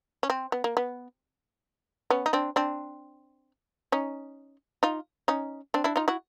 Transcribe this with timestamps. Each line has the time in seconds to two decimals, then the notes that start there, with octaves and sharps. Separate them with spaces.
0.23 C#4
0.30 C4
0.52 B3
0.64 A#3
0.77 B3
2.10 B3 C#4
2.26 D#4
2.33 C4 D4
2.56 C4 D4
3.92 C#4 D#4
4.83 D#4 F4
5.28 C#4 D#4
5.74 C4 D4
5.84 D4 E4
5.96 D#4 F4
6.08 E4 F#4